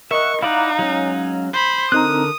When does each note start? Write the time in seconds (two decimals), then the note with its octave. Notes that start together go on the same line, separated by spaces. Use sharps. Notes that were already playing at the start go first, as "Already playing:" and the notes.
0.11 A#4 D#5 E5 F#5 C#6
0.42 D#4 E4 D5 F5 F#5 A#5
0.79 F#3 G#3 C#4
1.53 C5 B5
1.92 D3 C4 D#4 A#4 A#5 D#6 F#6